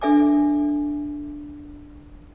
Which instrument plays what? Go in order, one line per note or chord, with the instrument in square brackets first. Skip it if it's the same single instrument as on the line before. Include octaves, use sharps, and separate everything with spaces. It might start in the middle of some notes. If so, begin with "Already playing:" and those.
[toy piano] D4 A4 E5 G#5 D6